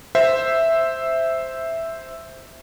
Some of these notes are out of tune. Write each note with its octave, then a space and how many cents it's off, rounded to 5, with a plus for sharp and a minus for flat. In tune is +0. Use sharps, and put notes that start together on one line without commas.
C5 +0 E5 +0